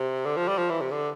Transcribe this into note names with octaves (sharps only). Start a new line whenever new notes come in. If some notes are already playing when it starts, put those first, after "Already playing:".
Already playing: C3
D3
F3
G3
F3
E3
C3
D3